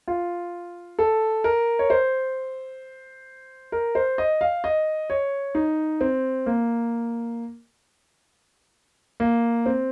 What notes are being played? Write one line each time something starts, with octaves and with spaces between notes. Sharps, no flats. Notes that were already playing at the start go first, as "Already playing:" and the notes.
F4
A4
A#4
C#5
C5
A#4
C5
D#5
F5
D#5
C#5
D#4
C4
A#3
A#3
C4